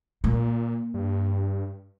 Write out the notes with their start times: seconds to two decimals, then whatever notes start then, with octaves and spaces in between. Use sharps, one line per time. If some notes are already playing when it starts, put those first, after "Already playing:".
0.24 A#2 A#3
0.94 G2